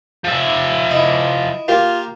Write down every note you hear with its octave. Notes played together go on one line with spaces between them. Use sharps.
F3 E5
E4 D#5
A#3 F4 G4 A#4